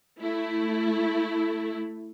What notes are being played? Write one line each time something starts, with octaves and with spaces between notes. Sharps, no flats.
A3 E4